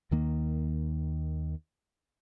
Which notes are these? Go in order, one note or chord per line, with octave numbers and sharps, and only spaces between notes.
D#2 D#3 A#3